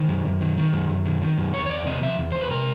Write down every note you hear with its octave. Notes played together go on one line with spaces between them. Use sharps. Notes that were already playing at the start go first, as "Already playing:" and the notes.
Already playing: D#3 C5
F#2
F#2
D#3
D#3
F#2
F#2
D#3
D#3
F#2
E2 C#5
C#5
E2 D5
C3 D#5
F3 E5
E2
E2 C5
B4
C3 A#4